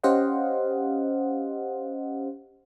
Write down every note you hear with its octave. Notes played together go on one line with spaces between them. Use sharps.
C#4 G4 C5 D#5 F5 F#5